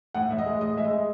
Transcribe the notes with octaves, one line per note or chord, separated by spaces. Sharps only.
A2 F#5
A2 E5
D#5
G#3
A2 D#5
G#3 E5
D#5
G#3